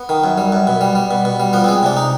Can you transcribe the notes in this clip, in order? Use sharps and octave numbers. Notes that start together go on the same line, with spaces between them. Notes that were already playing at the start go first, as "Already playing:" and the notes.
Already playing: B3
D#3
F#2
G3
F#2
B2
G3
G3
B2
B2
G3
F3 B3
C4
G#3
C3 D4
D#4